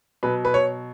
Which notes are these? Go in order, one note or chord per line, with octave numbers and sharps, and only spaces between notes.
B2 F#3 B4
B4
C#5